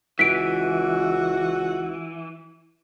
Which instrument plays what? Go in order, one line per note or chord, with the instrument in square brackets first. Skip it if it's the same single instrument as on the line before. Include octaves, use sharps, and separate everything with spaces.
[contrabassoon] C#2 [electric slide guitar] E3 [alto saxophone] F#4 [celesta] B6 D7